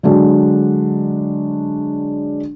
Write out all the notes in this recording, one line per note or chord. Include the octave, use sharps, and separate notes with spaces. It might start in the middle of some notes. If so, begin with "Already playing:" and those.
D3 F#3 G#3 D4